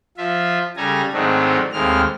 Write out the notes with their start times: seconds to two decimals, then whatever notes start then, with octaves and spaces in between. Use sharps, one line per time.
0.18 F3 F4 E5
0.77 C#3 G3 A4 G#5 A#5
1.13 G#2 D#3 F#3 A3 C4 D4
1.73 D#2 A2 G#3 C4 F6